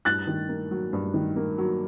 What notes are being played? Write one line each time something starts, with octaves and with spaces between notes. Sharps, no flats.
G2 F#6 A6
D#3
A#3
F#3
G2
D#3
A#3
F#3